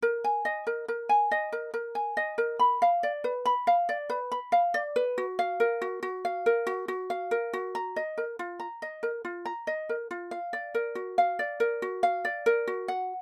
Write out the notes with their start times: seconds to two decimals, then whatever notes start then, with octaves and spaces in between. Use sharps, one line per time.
0.02 A#4
0.24 G#5
0.45 D#5
0.67 A#4
0.88 A#4
1.09 G#5
1.31 D#5
1.52 A#4
1.74 A#4
1.95 G#5
2.17 D#5
2.38 A#4
2.59 B5
2.82 F5
3.03 D5
3.24 B4
3.46 B5
3.67 F5
3.89 D5
4.10 B4
4.32 B5
4.52 F5
4.74 D5
4.96 B4
5.18 F#4
5.39 F5
5.60 A#4
5.82 F#4
6.03 F#4
6.25 F5
6.46 A#4
6.67 F#4
6.88 F#4
7.10 F5
7.31 A#4
7.53 F#4
7.75 A#5
7.96 D#5
8.18 A#4
8.39 F4
8.60 A#5
8.82 D#5
9.03 A#4
9.25 F4
9.45 A#5
9.67 D#5
9.89 A#4
10.11 F4
10.31 F5
10.53 D5
10.75 A#4
10.95 F#4
11.18 F5
11.39 D5
11.60 A#4
11.82 F#4
12.03 F5
12.25 D5
12.46 A#4
12.67 F#4
12.88 F#5